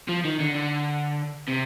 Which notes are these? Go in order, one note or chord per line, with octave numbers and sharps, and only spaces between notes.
F3
D#3
D3
D3
C3